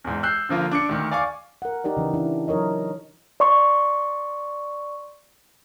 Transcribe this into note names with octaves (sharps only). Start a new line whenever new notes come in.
E2 G#2
E6 F#6 G6 C7
D3 F3 A#3 F4
D4 D6 C#7
D2 D#3
D5 F5 G#5 C#6 D6
A#4 F#5
D#4 G4 A#4 D5
C#3 E3
E3 D4 E4
F#3 D#4 A#4 C#5 D#5
D5 C6 C#6